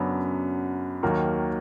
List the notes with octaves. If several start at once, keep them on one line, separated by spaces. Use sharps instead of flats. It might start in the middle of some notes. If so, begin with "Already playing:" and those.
Already playing: F#2 C#3 F#3 B3 D4
D#2 D#3 F#3 A#3